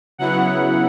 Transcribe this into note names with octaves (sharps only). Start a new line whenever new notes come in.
C#3 F#3 B3 E4 F#5